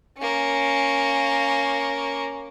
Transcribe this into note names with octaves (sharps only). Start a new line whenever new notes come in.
A#3 C#4